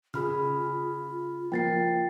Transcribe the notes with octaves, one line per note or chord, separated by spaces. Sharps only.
C#3 F4 G#4 B5 F6
F3 A#3 G5 A6 C7